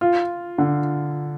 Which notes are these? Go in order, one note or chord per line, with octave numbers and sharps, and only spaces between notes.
F4
D3